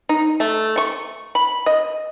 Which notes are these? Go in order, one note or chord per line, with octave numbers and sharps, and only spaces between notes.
D#4
A3
C#6
B5
D#5